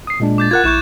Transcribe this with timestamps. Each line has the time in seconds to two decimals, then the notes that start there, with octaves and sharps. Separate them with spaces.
0.07 D#6 C7
0.20 A#2 G#3 D4
0.38 D6 G6 A6
0.51 F4 A#4 F#5 F#6 G#6
0.64 A#1 E4 C#6 G6 E7